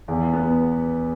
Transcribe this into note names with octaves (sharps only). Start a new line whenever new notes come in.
E2
B3